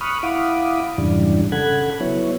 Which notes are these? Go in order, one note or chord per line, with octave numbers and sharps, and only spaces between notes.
B5 C#6 D#6 F6 F#6
E4 F5 F#5 B5 D6 D#6
F2 G#2 C#3 E3 G3 D4
C#3 A4 F#5 B5 F#6 G#6
F#3 B3 E4 C#5